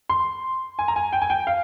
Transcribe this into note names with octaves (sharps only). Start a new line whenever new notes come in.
C6
G#5
A#5
G#5
G5
G#5
G5
F5